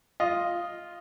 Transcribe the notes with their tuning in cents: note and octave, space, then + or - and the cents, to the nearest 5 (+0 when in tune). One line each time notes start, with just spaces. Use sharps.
F4 +0 D#5 +0